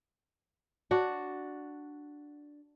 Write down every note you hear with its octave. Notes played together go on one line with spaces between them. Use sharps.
D4 F#4